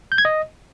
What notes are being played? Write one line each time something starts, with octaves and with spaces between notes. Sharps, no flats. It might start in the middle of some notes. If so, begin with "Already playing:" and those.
G6
G#6
D#5